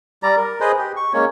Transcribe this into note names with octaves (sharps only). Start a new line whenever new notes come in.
G3 D5 A#5
A#4
G#4 B4 C5 D#5
G4
C#6
G#3 A#3 C#4 C#5